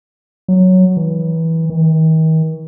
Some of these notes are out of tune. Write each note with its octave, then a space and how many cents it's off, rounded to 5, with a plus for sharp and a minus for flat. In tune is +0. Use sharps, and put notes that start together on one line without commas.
F#3 +0
E3 -20
D#3 +40